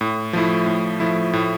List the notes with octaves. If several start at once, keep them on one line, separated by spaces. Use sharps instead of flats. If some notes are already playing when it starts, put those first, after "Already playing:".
A2
F3 A3 E4
A2
F3 A3 E4
A2